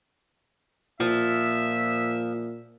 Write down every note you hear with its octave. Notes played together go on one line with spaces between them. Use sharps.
A#2 F3 E5